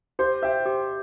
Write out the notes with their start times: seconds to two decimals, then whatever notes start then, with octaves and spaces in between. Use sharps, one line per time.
0.19 G4 C5
0.42 C5 E5 G5
0.66 G4